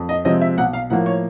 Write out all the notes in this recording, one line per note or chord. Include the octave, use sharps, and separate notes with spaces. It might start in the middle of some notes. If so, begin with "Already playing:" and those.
Already playing: F2
D#5
C3 F3 G#3 C4 D#5
E5
B1 F#5
F5
A2 F3 A#3 F#5
C#5